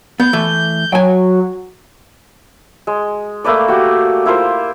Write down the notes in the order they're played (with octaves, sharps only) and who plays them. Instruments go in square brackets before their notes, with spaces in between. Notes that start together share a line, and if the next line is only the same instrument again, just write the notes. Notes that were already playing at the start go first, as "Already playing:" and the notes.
[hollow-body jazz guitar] B3 [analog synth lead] G6
[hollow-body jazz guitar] E3 A3
[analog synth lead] F#3 [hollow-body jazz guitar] G5 G#5
[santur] G#3
A3 A#3 B4 D5
F#4 G4
E4 F4 A#4 C5